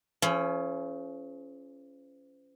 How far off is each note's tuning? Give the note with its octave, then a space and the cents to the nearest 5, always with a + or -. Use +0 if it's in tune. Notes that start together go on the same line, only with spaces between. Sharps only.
F3 -40 C#4 +0 G#4 +40